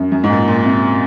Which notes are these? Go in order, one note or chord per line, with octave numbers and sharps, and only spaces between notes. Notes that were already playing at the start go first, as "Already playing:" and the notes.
Already playing: F#2
F#2
G#2
A#2
A#2
C3